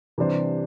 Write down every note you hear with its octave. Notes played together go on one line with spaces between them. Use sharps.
C3 E3 G3 D4 C5